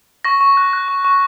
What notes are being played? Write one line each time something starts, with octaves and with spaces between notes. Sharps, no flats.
C#6 A#6
C#6
F#6
F#6
C#6
C#6